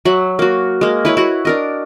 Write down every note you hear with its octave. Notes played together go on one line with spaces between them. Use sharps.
F#3 E5 F#5
A#3 F#4
G#3 A#3
E4 B4 C#5
E4 F#4 F#5
D4 A#4 D#5